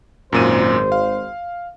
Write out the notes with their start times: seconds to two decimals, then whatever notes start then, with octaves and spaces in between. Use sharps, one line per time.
0.33 G#1 F#2 A#2 C5 D#7
0.92 F5